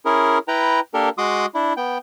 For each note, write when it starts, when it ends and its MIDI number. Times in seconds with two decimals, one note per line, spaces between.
0.05 0.38 61
0.05 0.38 64
0.05 0.38 68
0.05 0.38 70
0.48 0.80 64
0.48 0.80 71
0.48 0.80 79
0.48 0.80 82
0.94 1.09 58
0.94 1.09 62
0.94 1.09 67
0.94 1.09 69
0.94 1.09 70
1.18 1.46 56
1.18 1.46 66
1.18 1.46 84
1.18 1.46 86
1.18 1.46 87
1.54 1.73 62
1.54 1.73 64
1.77 1.98 59
1.77 1.98 79